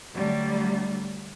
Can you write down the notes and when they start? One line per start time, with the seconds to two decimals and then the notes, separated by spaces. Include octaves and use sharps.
0.15 D3 F#3 G3 A3